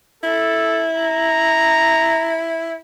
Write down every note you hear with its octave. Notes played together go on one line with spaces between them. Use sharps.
E4 A4
A#5